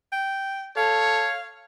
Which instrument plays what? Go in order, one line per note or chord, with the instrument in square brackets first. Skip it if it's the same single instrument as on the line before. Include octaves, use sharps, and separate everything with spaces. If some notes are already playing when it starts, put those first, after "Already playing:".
[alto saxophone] G5
[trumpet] A4 [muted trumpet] C#5 [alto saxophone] F5